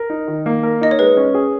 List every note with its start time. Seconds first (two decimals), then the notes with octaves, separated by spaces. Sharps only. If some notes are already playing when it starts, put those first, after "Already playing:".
Already playing: A#4
0.10 D#4
0.28 D#3
0.46 A#3
0.63 A#4
0.81 D#4 D#5
0.91 C#5
0.99 G#3 B4
1.17 C#4
1.34 G#4